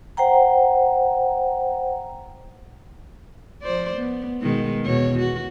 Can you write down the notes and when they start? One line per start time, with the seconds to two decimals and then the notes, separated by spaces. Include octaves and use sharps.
0.17 C5 F#5 G5 A#5
3.62 F3 C5 D5
3.96 B3
4.41 B2 D#3 G#3
4.85 E2 B2 C#5
5.19 F#4